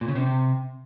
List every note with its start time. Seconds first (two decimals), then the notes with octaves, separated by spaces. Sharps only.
0.01 A#2
0.08 C#3
0.15 C3